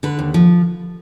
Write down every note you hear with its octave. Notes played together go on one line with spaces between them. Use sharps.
D3 B4
D#2
F3